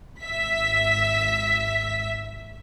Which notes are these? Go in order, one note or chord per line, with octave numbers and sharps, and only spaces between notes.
G#1 E5 B6